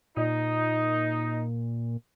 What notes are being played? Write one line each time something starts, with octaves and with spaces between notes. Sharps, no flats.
A#2 D#4